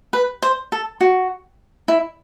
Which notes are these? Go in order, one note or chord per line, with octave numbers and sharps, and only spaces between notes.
B4
C5
A4
F#4
E4